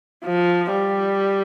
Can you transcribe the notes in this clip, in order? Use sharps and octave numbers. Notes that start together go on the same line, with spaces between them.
F3
G3